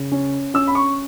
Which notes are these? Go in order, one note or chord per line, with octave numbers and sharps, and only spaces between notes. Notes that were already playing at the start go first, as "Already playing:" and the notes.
Already playing: C#3
C#4
C#4 E6
B5
C#6